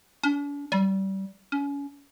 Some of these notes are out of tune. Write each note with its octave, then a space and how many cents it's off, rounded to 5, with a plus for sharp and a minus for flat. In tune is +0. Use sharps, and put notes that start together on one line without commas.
D4 -45
G3 -25
C#4 +30